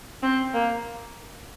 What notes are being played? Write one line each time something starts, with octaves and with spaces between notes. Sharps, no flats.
C4
A#3